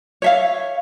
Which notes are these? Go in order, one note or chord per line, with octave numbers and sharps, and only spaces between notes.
C#5 E5 F5